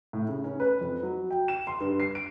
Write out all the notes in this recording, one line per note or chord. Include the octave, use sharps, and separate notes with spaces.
A2
C#3
C#4
B4
F2
F#3
G5
E7
C6
G2
C7
D7